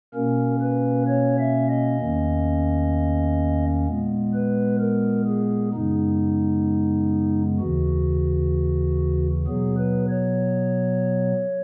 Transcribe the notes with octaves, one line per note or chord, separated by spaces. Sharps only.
B2 A#3 C#4 A#4
B4
C#5
E5
D#5
E2 D#3 A#3 C#4
A#2 G#3 B3
B4
A#4
G#4
F#2 C#3 G#3 B3 D#4
D#2 C#3 E3 F#4
B2 F#3 B3 G#4
B4
C#5